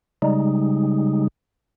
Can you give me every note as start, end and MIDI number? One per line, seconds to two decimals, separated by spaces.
0.22 1.28 49
0.22 1.28 55
0.22 1.28 56
0.22 1.28 63